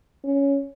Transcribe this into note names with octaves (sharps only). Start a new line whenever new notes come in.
C#4